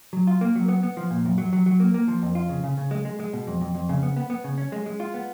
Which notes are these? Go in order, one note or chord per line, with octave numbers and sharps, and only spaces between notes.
F#3
F4
A#3
F#3
B3
B3
F3
A#2
F#2
F#3
F#3
F#3
A#3
A#3
F3
F2
F4
C#3
C#3
C#3
G#3
G#3
G#3
B2
F2
F2
F2
C#3
B3
B3
B3
C#3
C#4
G#3
G#3
F4
B3